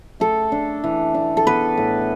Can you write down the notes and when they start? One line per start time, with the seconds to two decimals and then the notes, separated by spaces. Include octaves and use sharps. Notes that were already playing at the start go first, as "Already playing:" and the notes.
0.20 A3 A4
0.52 D4
0.84 E3
1.14 D4
1.37 A4
1.47 B3 B4
1.77 A2